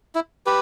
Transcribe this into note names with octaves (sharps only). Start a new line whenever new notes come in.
E4
G4 B4